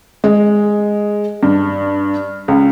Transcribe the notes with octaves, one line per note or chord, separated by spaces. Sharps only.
G#3
G2
C#2